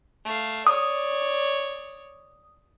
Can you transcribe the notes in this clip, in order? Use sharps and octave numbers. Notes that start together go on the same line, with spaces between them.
A3 F5
C#5 D5 D#6